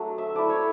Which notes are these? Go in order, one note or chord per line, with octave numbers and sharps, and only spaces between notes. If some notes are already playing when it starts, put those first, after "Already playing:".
Already playing: F#3 A3 D4
E5
A3 E4 D5
C#5